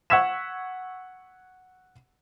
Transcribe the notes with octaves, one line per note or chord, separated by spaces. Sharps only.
F#5 C#6 E6 G#6 B6 E7